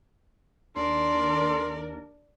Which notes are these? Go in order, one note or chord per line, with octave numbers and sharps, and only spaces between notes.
D#2 D4 A#4 D5 C6